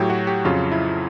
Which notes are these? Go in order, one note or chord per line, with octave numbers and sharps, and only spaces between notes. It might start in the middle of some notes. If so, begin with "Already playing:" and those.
Already playing: A2 F#3 G4
F#4
G4
F2 C#3 F#3 F4
E4